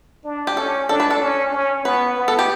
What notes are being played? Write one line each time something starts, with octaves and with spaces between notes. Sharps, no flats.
D4
G4
C#4 A4
D4 A4
B4
A4
C#4
C#4
B3 B4
B3
A4
G4